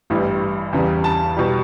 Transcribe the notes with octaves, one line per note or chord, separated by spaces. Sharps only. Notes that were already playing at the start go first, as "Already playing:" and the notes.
A1 G2 E3 G3
E2 C#3 E3 G3
A5
B2 G3